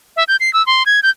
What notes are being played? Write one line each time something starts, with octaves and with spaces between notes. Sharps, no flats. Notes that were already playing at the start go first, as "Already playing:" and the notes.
E5
G6
C7
E6
C6
G#6
G6